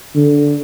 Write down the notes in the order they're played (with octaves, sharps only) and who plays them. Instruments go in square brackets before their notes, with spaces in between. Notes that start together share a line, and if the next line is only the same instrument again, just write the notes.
[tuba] D3